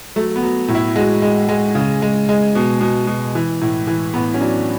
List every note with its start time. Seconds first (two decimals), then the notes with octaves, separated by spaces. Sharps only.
0.16 F#3 A3
0.36 B3
0.43 F#3
0.68 A2
0.75 E4
0.96 G#3 F#4
1.22 G#3
1.49 G#3
1.75 C#3
2.02 G#3
2.29 G#3
2.55 B2
2.81 B2
3.07 B2
3.35 E3
3.61 A2
3.87 E3
4.14 A2 B3
4.34 C#4
4.41 F#3 D4